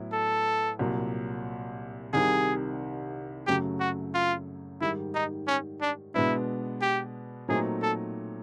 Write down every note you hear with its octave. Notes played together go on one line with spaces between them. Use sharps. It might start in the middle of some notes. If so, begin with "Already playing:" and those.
Already playing: A2 F#3 B3 E4
A4
C2 A#2 F#3
C2 C3 D#3 G3 G#4
F#2 C#3 F#3 A3 G4
F#4
F4
G#2 D#3 G3 E4
D#4
C#4
D4
B2 G#3 B3 D4 E4
G4
A#2 F#3 A3 C4 D#4 G#4
A4